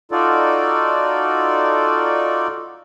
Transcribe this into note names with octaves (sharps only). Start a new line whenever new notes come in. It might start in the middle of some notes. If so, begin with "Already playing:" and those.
D#4 F4 F#4 A4 D5